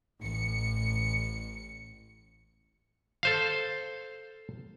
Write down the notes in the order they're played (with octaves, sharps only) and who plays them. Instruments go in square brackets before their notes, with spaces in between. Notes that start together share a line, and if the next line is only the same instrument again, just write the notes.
[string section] A1 C#7
[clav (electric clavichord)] A4 C5 F5